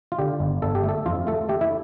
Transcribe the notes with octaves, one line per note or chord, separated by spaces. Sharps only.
F4
D3 G4
G1
G1 A4
G4
A3
A4
F2 F4
A3 A4
A3 G4
E4